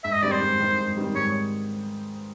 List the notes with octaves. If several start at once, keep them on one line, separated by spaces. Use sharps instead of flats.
G#2 E5
D#5
D#3 G3 C4 D#4 D5
C5
G#2
D#3 G3 C4 D#4
G#2
D#3 G3 C4 D#4
G#2 C#5